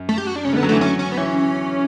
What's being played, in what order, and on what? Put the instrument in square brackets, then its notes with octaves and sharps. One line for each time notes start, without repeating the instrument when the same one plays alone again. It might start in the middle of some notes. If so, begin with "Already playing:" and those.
Already playing: [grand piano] F#2
[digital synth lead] A3
G4
F#4
D4
[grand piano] C#3 [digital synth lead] C#4
[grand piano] D3 [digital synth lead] A3 B3
[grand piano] F#3
[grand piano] E3 [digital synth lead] A3
[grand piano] F#3 [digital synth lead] C#4
[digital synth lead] C#4
B3
[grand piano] E3 [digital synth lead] C#4